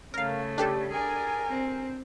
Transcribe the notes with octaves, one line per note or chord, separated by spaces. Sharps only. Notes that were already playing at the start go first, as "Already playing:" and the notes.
C#3 A3 A#4 F5
D4 G4 A4
G#4 A#4 D5 G#5
C4